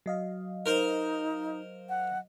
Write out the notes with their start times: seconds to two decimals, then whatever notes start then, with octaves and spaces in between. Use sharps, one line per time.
0.06 F#3 D#5 F5
0.66 D#4 A#4 C5
1.89 F#5